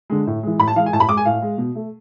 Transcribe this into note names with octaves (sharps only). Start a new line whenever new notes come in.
D3 G#3
A2
E3 G#3
A2 B5
A5
E3 G#3 F5
G#5
A2 A5
B5
G#3 D6
G#5
A2 F5
G#3
B2
A3